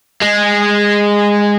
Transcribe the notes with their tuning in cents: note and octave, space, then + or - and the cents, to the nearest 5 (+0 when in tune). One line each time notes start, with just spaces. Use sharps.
G#3 -15